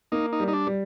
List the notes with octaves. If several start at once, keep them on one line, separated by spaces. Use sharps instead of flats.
A#3 D#4
D#4
G3
D#4
D4
G3